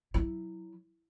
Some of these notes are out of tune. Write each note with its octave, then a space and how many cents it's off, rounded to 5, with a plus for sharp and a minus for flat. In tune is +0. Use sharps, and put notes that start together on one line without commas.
F#3 +0 E4 +0